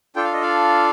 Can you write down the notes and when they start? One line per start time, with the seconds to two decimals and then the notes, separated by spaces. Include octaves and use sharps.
0.16 D4 F4 A4 G5
0.24 F5
0.33 D#5
0.42 D5 F5